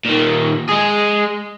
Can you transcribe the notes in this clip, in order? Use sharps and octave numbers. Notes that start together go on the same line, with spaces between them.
A#2 D#3
G#3 G#4